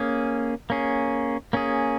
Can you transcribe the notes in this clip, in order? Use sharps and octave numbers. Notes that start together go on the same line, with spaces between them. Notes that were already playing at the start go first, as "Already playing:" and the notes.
Already playing: A#3 C#4 G#4
A#3 C#4 G#4
A#3 C#4 G#4